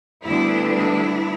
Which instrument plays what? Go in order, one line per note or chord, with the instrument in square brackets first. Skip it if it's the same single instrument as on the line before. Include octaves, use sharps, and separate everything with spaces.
[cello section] D2 D3 G3 B3 D4 E4
E4